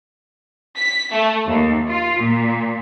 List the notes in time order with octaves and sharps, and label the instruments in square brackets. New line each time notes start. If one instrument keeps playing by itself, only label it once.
[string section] B6
A3
D#2
F4
A#2